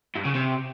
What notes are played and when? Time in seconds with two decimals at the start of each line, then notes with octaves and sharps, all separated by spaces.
0.16 G2
0.25 C#3
0.35 C3